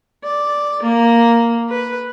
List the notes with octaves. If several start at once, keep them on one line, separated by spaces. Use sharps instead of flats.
D5
A#3
B4